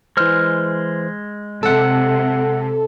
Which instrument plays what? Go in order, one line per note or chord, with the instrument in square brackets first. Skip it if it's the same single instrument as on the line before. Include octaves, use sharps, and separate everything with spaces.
[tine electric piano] E3 C5 [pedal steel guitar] G#3 F6
[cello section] C3 [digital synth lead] A4 [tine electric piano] F#5 E6